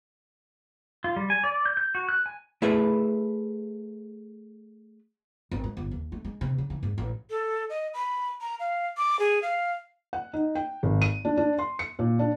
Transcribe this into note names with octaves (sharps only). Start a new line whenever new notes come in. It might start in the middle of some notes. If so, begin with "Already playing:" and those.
F4
G3
G#5
D5
G6
G6
F#4
F#6
G#5
A3 E4 G#4 B4 E5
G#1
G#2
G1
D#2
A3
G#3
C3
C#3
E3
G#2
A1
A4
D#5
B5
A#5
F5
D6
G#4
F5
F#5
D#4
G5
G#1
D#7
D4
D4
C6
C#7
A#2
D4